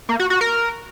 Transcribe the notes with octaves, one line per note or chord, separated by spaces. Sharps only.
A#3
F#4
F#4
A#4